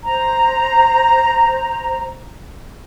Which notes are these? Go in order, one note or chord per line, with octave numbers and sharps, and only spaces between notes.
C5 A#5